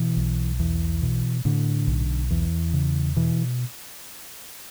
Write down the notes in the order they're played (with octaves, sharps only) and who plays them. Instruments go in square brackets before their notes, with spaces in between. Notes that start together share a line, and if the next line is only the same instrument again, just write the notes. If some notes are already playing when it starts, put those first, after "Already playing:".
Already playing: [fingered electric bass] B2 E3
B1
E2 E3
B2
A2 D3
B1
E2 E3
C#3
B2 E3